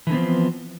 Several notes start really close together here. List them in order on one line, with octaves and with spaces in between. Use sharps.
E3 D3 B3 C4 F3